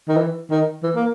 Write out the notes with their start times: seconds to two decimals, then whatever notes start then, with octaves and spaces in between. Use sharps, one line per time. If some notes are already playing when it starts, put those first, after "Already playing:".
0.08 D#3
0.17 E3
0.50 D#3
0.83 E3
0.95 A#3